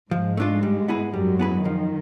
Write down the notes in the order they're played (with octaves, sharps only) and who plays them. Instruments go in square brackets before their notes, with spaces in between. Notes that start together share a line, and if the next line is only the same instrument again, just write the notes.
[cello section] G#2 G#3 [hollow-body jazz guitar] F3
[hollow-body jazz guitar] A3 D4 F4
G3
B3 E4 G#4 B4
[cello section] F#2 F#3 [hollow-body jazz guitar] G3
[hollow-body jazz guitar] B3 E4 G#4 B4
[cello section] D#3 [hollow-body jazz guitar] F3